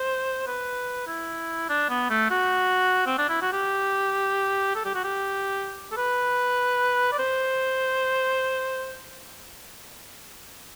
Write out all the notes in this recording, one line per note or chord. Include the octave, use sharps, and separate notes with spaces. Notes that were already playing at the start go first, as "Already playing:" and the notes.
Already playing: C5
B4
E4
D4
B3
A3
F#4
C4
D4
E4
F#4
G4
A4
G4
F#4
G4
A4
B4
D5
C5